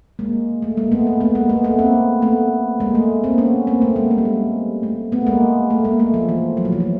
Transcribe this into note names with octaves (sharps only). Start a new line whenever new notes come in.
G#3 A#3
A3
G#3 A#3
A3 B3
A3
A3 B3
G#3 A#3
A3 B3
A3 B3
A#3 C4
A3 B3
G#3 A#3
A3
A#3 C4
B3 C#4
A#3 C4
A3 B3
G#3 A#3
A3
G3
G#3
A3
A3 B3
G#3 A#3
A3
G#3 A#3
A3
F3
E3
F#3
F3
E3
F3